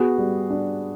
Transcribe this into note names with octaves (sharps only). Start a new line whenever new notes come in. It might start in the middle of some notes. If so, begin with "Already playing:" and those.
Already playing: B3 F#4 G#4
G3
D4